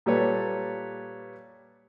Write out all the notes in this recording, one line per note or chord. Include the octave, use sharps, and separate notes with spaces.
A#2 G3 A4 B4 C#5